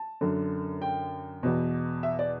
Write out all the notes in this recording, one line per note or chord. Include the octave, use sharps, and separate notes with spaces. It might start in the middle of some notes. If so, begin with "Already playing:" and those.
Already playing: A5
F#2 D3
G5
E2 B2
E5
D5